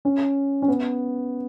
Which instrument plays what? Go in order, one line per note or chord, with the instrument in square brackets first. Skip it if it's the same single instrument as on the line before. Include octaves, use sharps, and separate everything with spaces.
[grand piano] C#4
C#4
B3